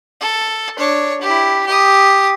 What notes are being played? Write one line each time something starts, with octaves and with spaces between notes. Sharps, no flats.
A4
D4 C#5
E4 G4
G4 D#6